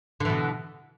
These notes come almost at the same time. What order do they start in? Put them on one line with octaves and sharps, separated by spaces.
D3 E3 B2